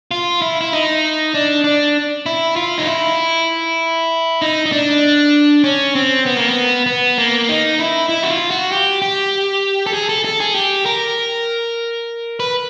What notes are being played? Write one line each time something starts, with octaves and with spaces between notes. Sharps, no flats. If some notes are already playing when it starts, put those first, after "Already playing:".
F4
E4
E4
D#4
D4
D4
E4
F4
D#4
E4
D#4
D#4
D4
C#4
C4
B3
A#3
B3
B3
A#3
D#4
E4
E4
F#4
F4
F#4
G4
G4
A4
G#4
A4
A4
G#4
G4
A#4
B4